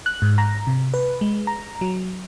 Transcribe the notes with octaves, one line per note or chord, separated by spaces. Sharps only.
F#6
G#2
A#5
C3
B4
G#3
A#5
F#3